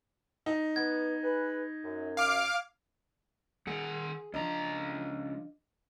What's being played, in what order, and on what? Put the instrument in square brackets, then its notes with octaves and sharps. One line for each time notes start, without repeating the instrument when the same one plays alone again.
[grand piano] D#4
[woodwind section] B3 [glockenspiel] G#6
[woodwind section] G#4 B4
F#2
[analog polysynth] F5 D6
[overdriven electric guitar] D#3 F#5 [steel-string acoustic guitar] G#4
[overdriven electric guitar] C#2 A#5 [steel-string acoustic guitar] F3 D4 D#5